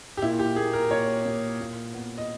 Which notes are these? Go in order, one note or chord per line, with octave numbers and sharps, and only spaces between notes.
G4
A#2 E4
G4
A#3 G#4
A#4
A#2 C#5
A#2
A#2
B3
D#5